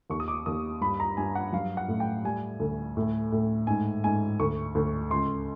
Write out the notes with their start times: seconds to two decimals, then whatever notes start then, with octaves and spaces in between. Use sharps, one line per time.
0.10 D#2 C#6
0.20 D#6
0.28 D6
0.46 D#2 D#6
0.81 G2 B5
1.00 A#5
1.17 G2 G#5
1.35 F#5
1.52 F#3 F5
1.77 F#5
1.88 A2
2.00 G5
2.24 G3 G#5
2.60 D2
2.97 A2
3.32 A2
3.67 G#2 G#5
4.04 G#2 G#5
4.40 D2 C#6
4.75 D2
5.10 C#2 C6